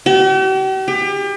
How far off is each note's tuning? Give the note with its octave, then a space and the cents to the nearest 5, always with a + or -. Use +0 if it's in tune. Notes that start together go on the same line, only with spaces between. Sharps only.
G4 -45
G4 +35